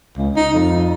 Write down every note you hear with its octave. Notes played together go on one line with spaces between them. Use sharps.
C#2
D#4
F2